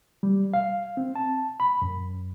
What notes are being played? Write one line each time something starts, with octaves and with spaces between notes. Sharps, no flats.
G3
F5
C4
A5
B5
F#2